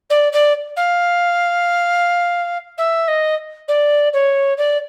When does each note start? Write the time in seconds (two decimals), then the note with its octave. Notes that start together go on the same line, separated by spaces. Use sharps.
0.10 D5
0.32 D5
0.76 F5
2.77 E5
3.07 D#5
3.68 D5
4.13 C#5
4.57 D5